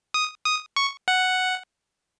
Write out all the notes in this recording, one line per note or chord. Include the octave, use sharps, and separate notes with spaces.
D#6
D#6
C#6
F#5